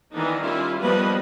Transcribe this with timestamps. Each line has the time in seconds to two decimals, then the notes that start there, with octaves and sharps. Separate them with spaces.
0.12 D#3 E3 B3 D4 D#4
0.42 G3 C#4 E4 F4
0.81 F3 G3 A#3 B3 B4 D#5